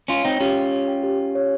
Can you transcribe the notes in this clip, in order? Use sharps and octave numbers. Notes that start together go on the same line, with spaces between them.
C#4 F4 C#5
C4 D#4 G5
C#4 F4 G4
G4
C#5
G5
G4
G4
C#5